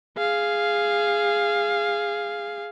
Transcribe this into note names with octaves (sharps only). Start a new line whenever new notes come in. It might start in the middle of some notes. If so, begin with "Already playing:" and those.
G#4 F5